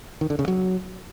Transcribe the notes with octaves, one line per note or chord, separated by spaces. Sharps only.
D#3
D3
C#3
F#3